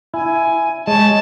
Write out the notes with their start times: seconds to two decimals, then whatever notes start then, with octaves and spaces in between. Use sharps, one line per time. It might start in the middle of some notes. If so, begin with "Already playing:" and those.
0.14 E4 G#5
0.87 G#3 C#5 A5